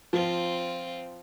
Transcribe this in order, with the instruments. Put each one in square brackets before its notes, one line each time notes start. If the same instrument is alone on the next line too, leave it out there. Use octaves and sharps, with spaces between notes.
[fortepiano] F3 [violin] C4 F4